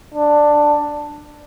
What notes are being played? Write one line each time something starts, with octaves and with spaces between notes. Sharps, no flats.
D4